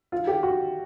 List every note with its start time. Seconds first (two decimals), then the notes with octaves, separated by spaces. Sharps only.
0.12 F4
0.27 G4
0.43 F#4